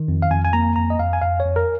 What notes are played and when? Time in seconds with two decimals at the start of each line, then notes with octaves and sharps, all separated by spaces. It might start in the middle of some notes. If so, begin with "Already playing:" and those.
Already playing: D#3
0.08 F2
0.22 F5
0.30 F2 G#5
0.45 G#5
0.53 A#3 A#5
0.76 F2 A#5
0.90 D#5
0.99 F2 F5
1.13 G#5
1.22 F2 F5
1.40 C#5
1.45 F2
1.56 A#4